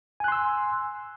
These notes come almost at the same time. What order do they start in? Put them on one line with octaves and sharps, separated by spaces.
G#5 F#6 C6 E6